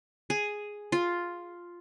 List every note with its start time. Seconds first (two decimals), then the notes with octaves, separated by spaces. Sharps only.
0.30 G#4
0.92 F4